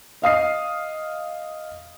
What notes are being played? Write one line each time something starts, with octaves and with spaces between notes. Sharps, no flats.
D#5 F5 D#6 C7